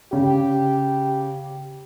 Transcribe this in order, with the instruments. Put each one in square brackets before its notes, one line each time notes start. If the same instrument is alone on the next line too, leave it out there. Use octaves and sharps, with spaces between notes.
[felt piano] C#3 [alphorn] G4